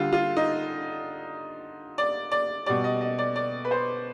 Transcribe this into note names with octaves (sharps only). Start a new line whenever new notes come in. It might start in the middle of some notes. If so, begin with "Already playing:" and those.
Already playing: D3 G3 F4
F4
D#4
D5
D5
B2 G3 D5
D#5
D#5
D5
D5
B4
C5